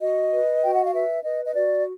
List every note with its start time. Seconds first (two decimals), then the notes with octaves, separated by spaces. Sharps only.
0.01 F#4 D#5
0.32 B4
0.64 F#4 G5
0.74 F#5
0.84 F5
0.93 B4 E5
1.25 B4 D#5
1.45 D#5
1.55 F#4 D5